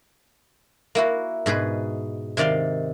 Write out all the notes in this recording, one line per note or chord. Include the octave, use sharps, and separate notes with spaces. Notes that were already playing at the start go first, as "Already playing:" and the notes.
A#3 E4 F#4
G#2 B2 G#4 B4
C3 D#3 D5 F5 C6